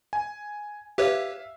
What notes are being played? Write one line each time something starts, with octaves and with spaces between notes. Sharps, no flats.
G#5
G4 B4 C#5 E5 F5